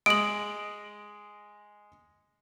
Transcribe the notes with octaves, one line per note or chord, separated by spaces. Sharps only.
G#3 D#5 D#6 D7 F#7